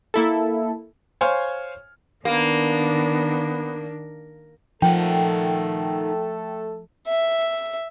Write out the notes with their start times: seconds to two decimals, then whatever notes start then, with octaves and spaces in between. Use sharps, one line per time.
0.14 A#3 E4 A4
1.21 C5 C#5 F5 G#5 F6
2.25 D#3 A#3 B3 D4
4.82 F3 A3 D#4 A4 A#4 F#5 G5
7.08 E5